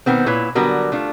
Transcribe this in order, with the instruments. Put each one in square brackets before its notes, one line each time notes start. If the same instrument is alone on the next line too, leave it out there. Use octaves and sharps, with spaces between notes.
[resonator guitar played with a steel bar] B2 D#3 B3 C4
A#2 E4 B4 C#5
D3 F#3 G3 B3 F#4 A#4
A3 D4 F4